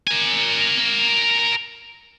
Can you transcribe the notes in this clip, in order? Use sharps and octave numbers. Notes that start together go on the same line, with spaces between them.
A#4 G#5